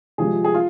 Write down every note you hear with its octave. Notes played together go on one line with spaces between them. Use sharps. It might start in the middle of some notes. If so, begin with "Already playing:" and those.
C3 F3 G#3 G#4
G#4
F4